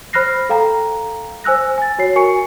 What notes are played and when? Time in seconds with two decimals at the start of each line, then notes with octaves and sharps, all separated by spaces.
0.13 C5 B5 F6 F#6 A#6 C7
0.49 A4 F5 G5 A#5
1.44 C5 G#5 E6 F#6 A#6
1.78 G#5 A6
1.99 F#4 C#5 C7
2.16 F#4 A#4 G#5 C#6 C#7